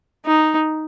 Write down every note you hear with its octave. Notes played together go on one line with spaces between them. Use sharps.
D#4